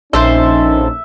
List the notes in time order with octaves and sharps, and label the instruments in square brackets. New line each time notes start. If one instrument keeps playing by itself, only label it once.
[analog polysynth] A#1 [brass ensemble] C#4 D#4 [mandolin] A4 C5 G6 [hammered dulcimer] E5